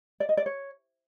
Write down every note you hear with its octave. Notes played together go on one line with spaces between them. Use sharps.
D5
D#5
D5
C#5